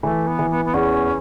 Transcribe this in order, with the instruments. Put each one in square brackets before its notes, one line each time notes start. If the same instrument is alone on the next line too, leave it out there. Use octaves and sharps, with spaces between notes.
[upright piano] E3 [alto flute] A3
[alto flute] B3
[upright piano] E3
[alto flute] B3
B3
[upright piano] E2 [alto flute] C#4